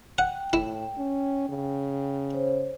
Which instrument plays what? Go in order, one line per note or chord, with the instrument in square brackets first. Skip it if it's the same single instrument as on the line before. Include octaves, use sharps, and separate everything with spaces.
[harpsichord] F#5 [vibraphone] G5
[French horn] A2 [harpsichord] E4
[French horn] C#4
C#3
[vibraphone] C5 C#5